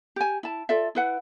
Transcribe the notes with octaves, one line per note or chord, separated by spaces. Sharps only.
G4 G#5
E4 A5
F4 A4 D5 E5
E4 B4 F#5